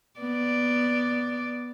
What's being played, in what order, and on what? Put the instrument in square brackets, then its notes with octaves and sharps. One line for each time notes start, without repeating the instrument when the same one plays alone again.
[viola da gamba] B3 D5